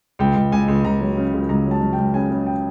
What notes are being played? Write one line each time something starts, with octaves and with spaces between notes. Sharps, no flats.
C#2 G5
C#2
C#2 G#5
C#2
C#2 A#5
F#3
C#3
C#2
C#2 A#5
F#3
A5
F#3
G5
C#2
C#3 G#5
C#3
G5